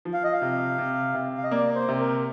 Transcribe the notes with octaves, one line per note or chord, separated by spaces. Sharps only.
F3
F5
D#5
F5
C3
C3
C3
F5
D#5
A#3 D5
C5
C3
A#4